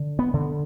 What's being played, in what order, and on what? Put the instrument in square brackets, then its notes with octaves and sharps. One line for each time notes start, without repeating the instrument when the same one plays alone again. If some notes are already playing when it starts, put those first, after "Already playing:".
Already playing: [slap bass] D3
B3
D3